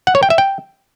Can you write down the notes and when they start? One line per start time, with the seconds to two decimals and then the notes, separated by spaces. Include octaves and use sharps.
0.07 F#5
0.15 C#5
0.23 G5
0.30 E5
0.38 G5